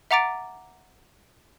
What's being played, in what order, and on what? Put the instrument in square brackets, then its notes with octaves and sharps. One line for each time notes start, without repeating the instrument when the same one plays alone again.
[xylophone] E5 F#5 A#5 D6 A6 D7